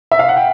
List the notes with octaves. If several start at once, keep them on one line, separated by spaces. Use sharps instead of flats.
E5
F5
F#5
G5